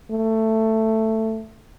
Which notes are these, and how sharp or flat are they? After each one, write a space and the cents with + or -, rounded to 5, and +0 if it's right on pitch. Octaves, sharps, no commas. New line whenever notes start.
A3 +10